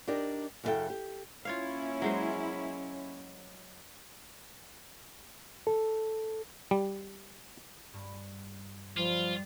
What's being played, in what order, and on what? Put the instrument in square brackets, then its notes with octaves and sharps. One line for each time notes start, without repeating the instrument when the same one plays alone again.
[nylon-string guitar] D4 D#4 G4 A#4 D5
F#2 C#3 C#4 E4 A4 G5
G4
[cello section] A#3 C#4 E4 [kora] F4 C#5 F5
[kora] F#3 G#3 C5
[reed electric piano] A4
[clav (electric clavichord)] G3
[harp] G2
[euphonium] F3 [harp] G3 [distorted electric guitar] F4